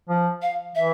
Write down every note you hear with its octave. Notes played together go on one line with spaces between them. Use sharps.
F3
F5
E3 E5